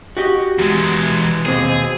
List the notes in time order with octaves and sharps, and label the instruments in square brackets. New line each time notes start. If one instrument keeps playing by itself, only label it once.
[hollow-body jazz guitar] F#4 G4 D#5
[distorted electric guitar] E2 G#3
[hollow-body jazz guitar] D#2 B2 C4 [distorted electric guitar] G#4